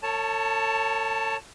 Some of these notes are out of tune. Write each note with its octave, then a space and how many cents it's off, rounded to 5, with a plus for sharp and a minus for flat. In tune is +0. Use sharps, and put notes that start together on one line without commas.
A4 +40 C#5 +0 A5 +0